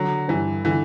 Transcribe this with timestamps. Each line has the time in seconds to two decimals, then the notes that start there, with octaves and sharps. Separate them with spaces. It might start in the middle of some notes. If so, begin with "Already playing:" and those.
Already playing: D3 F#3
0.28 G2 E3
0.65 D3 E3